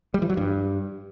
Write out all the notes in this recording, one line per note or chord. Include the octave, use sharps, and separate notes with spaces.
G3
E3
F#3
G2